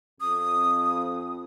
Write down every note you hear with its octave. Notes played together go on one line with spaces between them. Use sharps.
F2 D#6